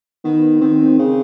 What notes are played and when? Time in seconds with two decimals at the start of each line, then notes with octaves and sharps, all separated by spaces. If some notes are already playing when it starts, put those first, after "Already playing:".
0.24 D#3 B3
0.61 D#3 C4
0.99 C#3 C4